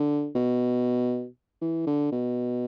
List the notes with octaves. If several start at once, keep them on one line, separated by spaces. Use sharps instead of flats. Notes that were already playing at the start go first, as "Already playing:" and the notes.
Already playing: D3
B2
E3
D3
B2